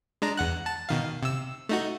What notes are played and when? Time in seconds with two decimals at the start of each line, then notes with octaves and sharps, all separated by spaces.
0.22 G#3 D4 A#5
0.37 E2 F#5 F#6
0.66 A5
0.89 B2 D#3 F5
1.23 C3 E6
1.69 A3 D#4 F#4